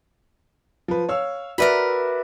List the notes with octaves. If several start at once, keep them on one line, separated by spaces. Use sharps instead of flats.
F3 B4
C#5 F5 E6
F#4 A#4 B4 D5 E5 B5